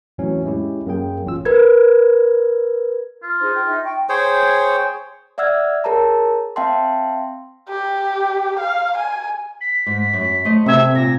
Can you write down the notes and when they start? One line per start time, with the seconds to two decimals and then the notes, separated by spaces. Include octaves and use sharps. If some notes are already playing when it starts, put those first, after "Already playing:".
0.18 F2 A2 E3 F#3 C#4
0.46 G#3 C#4 E4 G4
0.87 F#2 A#3 G#4 G5
1.26 A1 C#4 F4 E6
1.45 A#4 B4 G#6
3.23 F4
3.40 D#4 G#4 C5
3.54 G5
3.67 D#4 E5
3.84 G5 C#6
4.09 G#4 C5 C#5 G5
5.38 D5 E5 F#5 E6 F6 G#6
5.84 G#4 A#4 C#5 A5 A#5
6.56 C4 E5 F5 G5 A5 C6
7.69 G4
8.59 F5
8.97 G#5
9.61 B6
9.86 G#2
10.13 F#2
10.45 A3 C5 D#5
10.66 C3 C4 A4 E5 G#6
10.95 A#2 A#6